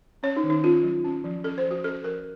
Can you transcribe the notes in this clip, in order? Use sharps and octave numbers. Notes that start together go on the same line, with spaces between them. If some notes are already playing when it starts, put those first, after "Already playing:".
C#4 C#5
D#4
D#3
D#4
C#4 F4
F#3
C#4
F3
C#4 A4
C5
F3
F#4
C#4 A4
F3 A#4